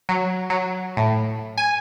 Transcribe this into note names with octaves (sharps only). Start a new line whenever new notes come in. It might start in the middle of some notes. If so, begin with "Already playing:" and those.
F#3
F#3
A2
G#5